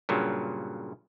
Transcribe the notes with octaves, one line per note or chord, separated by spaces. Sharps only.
G2 A#2 C#3 F#3